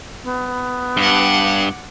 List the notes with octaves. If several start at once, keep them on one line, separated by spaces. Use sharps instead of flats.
B3
G2 F#5 D6